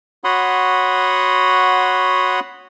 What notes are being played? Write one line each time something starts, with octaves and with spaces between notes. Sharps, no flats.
F#4 C#5 F#5 B5 C6 D#6